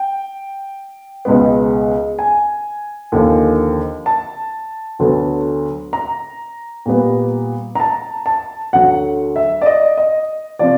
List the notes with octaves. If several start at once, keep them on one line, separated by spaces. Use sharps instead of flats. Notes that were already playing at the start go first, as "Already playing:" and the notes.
Already playing: G5
C#2 B2 G#3 B3
G#5
D#2 D3 F3
A5
D2 D3 F#3 B3
A#5
A#2 G3 B3
A#5
A5
A5
D2 D3 F#3 F#5
E5
D5
D#5
D#5
C3 F3 D5